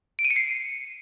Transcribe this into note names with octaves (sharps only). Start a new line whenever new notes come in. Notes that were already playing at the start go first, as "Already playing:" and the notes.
D7
D#7
C#7
C7